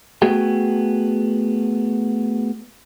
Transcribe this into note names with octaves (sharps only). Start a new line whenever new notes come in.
A3 B3 F#4 G#4 G5